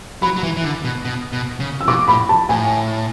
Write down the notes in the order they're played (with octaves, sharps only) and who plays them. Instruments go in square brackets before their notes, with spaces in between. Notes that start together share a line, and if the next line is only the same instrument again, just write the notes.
[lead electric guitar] F#3 [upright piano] B5
[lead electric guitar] F#3
E3
E3
D3
B2
B2
B2
C#3
[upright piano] E6
[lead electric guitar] B2 [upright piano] D6
[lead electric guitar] A2 [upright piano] B5
[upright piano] A5
[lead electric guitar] A2 [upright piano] G#5